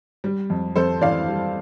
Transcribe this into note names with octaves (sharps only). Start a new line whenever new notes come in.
G3
F2
F2 A4 C5
E3 D5 F5
G3